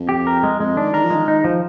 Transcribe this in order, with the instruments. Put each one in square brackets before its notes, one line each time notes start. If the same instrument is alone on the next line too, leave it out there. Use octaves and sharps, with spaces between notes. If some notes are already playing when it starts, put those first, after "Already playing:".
Already playing: [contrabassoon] F2
[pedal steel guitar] G4
A#4
G#3
[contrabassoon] F2 [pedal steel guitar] G#3
[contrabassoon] D#3 [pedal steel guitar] D4
[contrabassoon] D#3 [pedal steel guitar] A#4
[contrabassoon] F3
[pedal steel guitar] G#3
[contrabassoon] D#3
[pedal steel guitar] D#4
F3